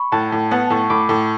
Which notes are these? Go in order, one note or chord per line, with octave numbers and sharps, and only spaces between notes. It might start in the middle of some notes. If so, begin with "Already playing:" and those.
Already playing: B5 C#6
A2 F#5 A5
A2
B3 F#5 A5
A2 A5 C#6
A2 B5 D6
A2 A5 C#6